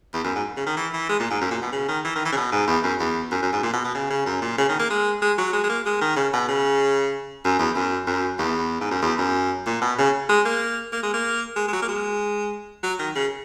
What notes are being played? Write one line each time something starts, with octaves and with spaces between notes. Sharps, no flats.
E2
F#2
G#2
C#3
D#3
E3
E3
G#3
A#2
G#2
F#2
A#2
B2
C#3
D#3
E3
D#3
E3
C#3
B2
G#2
E2
F#2
E2
F#2
F#2
G#2
A#2
B2
B2
C#3
C#3
F#2
A#2
C#3
D#3
A#3
G#3
G#3
F#3
G#3
G#3
A#3
G#3
D#3
C#3
B2
C#3
F#2
E2
F#2
F#2
E2
G#2
F#2
E2
F#2
A#2
B2
C#3
G#3
A#3
A#3
G#3
A#3
G#3
G#3
F#3
A#3
G#3
F#3
D#3
C#3